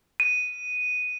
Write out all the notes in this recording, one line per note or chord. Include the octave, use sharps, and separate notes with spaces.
D#7